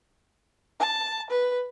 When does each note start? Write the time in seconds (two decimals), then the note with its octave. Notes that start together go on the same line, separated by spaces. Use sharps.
0.80 A5
1.30 B4